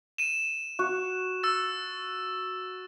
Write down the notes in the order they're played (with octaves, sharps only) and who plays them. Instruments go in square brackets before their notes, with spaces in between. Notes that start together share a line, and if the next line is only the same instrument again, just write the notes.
[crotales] D#7 E7
[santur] F#4
[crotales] E6 A6